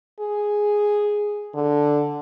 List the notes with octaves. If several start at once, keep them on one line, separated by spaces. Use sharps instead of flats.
G#4
D3